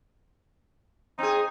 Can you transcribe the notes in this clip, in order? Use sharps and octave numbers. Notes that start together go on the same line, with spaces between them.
C4 D#4 G#4